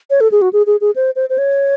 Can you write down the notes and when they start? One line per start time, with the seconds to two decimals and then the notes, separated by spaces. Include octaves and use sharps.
0.10 C#5
0.21 A4
0.32 G#4
0.42 F#4
0.53 G#4
0.67 G#4
0.81 G#4
0.96 C5
1.16 C5
1.29 C5
1.38 C#5